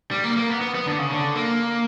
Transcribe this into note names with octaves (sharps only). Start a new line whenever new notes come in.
G3
A#3
A#3
B3
B3
B3
D3
C#3
D3
A#3